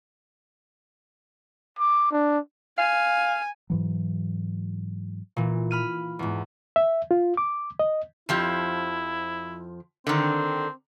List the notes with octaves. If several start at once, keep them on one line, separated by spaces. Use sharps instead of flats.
D6
D4
F5 G#5
G#2 E3 F#3
A#2 E3
B5 F6 D#7
E2 G#2
E5
F4
D6
D#5
F2 F3 E4 G4
D3 D#3 C4